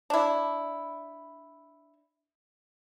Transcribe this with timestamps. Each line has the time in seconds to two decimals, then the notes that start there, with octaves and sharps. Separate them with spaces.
0.10 D4 E4